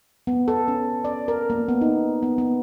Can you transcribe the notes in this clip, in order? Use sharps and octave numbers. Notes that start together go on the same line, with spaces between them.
B3
A4
C#4
D5
A#4
A#3
B3
D#4
B3
B3